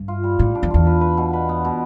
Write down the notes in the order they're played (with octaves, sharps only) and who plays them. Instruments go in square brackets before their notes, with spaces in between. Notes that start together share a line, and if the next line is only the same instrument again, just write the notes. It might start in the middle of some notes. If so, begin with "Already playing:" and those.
Already playing: [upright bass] G2
[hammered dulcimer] F4
G3
[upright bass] A2 [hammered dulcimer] G3
[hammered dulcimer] D4
[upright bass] F2
[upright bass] E2 [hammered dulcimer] F4
[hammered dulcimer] B4
B4
B2
B4
B3
B2